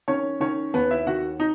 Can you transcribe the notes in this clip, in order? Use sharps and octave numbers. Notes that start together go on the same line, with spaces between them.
D#3 C#4 C#5
D#3 C#4 C#5
D#2 B3 B4
E4 E5
D#3 F#4 F#5
D#4